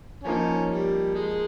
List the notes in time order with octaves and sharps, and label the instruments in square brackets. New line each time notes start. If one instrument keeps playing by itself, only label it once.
[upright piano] F3 A#3 D#4 [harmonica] C#4
[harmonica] G3
G#3